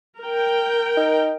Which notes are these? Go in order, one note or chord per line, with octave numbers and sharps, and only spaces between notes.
A#4 G5
D#4